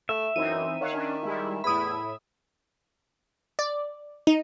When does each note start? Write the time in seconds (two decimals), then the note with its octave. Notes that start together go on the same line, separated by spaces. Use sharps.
0.09 A3 E5
0.36 F#2 E3 C4 D#4 D#7
0.81 D#3 C#5 F5 F#5
0.92 C#4 D4
1.23 G3 G#3 E4
1.64 E2 A2 E4 B5 D#6
3.59 D5
4.27 D#4